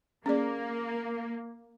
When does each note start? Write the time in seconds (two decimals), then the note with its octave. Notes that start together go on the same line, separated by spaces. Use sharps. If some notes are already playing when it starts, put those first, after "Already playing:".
0.26 A#3 C#4 G#4 D5